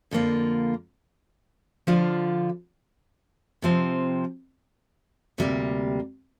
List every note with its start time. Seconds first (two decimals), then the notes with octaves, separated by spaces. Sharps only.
0.11 F2 D3 A#3 F4
1.87 D3 F3 D4 F4
3.62 C3 F3 C4
5.38 D2 C3 G3 A#3